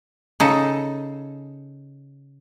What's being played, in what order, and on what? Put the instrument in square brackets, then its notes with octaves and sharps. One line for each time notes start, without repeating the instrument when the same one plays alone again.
[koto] C#3 D#4 A4